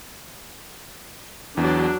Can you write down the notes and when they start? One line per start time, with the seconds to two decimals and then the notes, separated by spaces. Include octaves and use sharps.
1.57 E2 F#3 D4